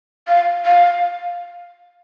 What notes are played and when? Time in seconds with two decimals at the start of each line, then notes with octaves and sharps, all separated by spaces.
0.27 F5
0.65 F5